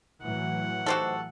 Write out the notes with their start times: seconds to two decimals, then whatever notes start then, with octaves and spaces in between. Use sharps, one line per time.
0.23 A2 E3 F#3 F#5
0.86 D#4 F#4 G4 A4 C5